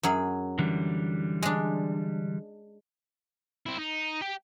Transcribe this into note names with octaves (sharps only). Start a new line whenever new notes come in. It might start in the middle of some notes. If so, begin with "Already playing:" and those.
F#2 F#3 G#4
D3 E3 G3
G#3 D4
C4 E4
D#4
G4 G5